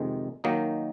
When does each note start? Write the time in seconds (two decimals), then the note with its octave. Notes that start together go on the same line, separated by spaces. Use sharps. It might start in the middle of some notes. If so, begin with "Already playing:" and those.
Already playing: F2 C3 D#3 G#3
0.44 D#3 F#3 A#3 D#4